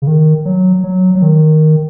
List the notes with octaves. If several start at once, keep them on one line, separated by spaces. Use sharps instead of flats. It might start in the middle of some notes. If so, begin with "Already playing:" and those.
C#3
D#3
F#3
F#3
F#3
D#3